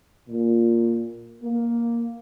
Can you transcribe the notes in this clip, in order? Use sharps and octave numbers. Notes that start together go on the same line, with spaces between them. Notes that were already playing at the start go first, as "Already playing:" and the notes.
A#2
A#3